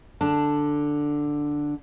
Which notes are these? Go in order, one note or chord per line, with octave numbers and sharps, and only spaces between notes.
D3 D4 A5